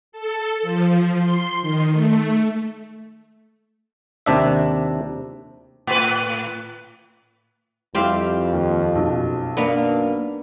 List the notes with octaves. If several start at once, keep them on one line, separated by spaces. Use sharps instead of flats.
A4
F3
C6
D#3
A3
D#2 C3 D4 E5
A2 B4
F2 G3 C4 E4 F4 G4 F5
D#2
B1 F#2
A#3 B3 D4 A#5